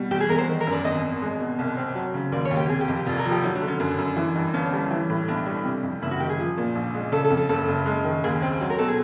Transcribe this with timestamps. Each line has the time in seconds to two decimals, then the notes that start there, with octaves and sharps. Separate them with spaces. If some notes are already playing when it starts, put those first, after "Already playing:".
Already playing: B2 G3
0.11 E2 G4
0.20 G#4
0.29 E2 A#4
0.38 C5
0.48 D#3
0.60 A#4
0.67 F#2
0.73 D5
0.84 G#1 D#5
1.04 G#1
1.22 G#3
1.40 B2
1.59 C2
1.77 C4
1.95 F#3
2.14 C#3
2.32 D#2 D5
2.45 C#5
2.51 D#2
2.57 G4
2.69 C3 G#4
2.81 G4
2.88 F2
3.06 F1 F4
3.19 A#4
3.25 F3
3.31 G4
3.43 F#3 D#4
3.55 D4
3.62 D3
3.68 C#4
3.80 F#2 D4
3.98 F#2
4.16 E3
4.36 G2
4.54 G1 C#4
4.73 G3
4.91 E3
5.10 A2
5.28 B1 D4
5.46 G3
5.65 C3
5.83 F2
6.02 F#1 E4
6.11 F#4
6.20 D#3 G4
6.29 G#4
6.39 F3
6.58 A#2
6.75 A#1
6.95 G#3
7.12 C#3 A4
7.25 A4
7.30 F2
7.37 A4
7.49 F#1 A4
7.68 F#1
7.86 G#3
8.04 D#3
8.24 D#2 G#4
8.42 C4
8.61 F#3
8.70 A#4
8.78 B2 A4
8.88 G#4